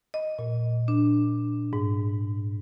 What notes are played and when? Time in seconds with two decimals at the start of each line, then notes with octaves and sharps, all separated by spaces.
0.14 D#5
0.39 A#2
0.88 D4
1.73 G#2